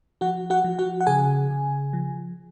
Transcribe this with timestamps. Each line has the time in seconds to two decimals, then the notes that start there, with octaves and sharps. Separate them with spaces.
0.21 F3 F#4 F#5
0.50 F#4 F#5
0.64 F3
0.79 F#4 F#5
1.01 F#5
1.07 C#3 G#4 G#5
1.50 C#3
1.93 F3